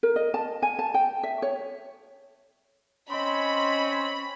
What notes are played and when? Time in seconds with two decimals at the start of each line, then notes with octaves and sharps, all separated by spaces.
0.03 A#4
0.16 D#5
0.34 A5
0.62 G#5
0.79 A5
0.94 G5
1.23 E5
1.42 C#5
3.10 C4 C#4 D#5 B5 C6